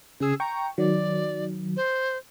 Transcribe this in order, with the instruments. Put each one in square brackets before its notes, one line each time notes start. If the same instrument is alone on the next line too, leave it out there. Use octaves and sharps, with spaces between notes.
[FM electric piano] C#3 E6 [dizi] G#4
[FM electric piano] G5 C#6 [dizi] A#5
[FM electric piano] D#3 F#3 [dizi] D5
[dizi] C5